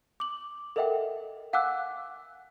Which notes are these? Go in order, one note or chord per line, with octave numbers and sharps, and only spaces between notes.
D6 F#7
A4 A#4 D#5 E5 F#5 G5
F5 F#5 G#5 D6 E6 F#6